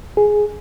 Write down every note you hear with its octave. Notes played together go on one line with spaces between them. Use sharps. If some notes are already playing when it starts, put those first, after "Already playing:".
G#4